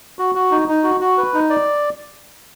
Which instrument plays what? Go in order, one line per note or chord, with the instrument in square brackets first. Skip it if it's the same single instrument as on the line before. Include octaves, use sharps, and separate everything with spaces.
[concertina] F#4
F#4
D#4
D#4
F#4
F#4
B4
D#4
D5